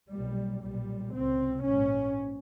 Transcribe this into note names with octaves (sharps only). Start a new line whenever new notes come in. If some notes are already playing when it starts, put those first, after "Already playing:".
B1 A#2 G3
B1 A#2 G3
C#2 C3 C4
A#1 G#2 C#4